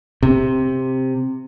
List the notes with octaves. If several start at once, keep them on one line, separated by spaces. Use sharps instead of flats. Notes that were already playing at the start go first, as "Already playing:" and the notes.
C3